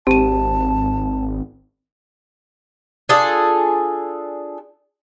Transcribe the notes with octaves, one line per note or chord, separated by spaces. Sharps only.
G#1 C4 G4 A5 D#7
D4 F4 G#4 A4